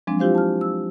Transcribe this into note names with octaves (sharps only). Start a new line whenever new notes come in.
F3 F#3 G#3 C4 D4
E4 F4 G4 C5 F5
A5 F6
E6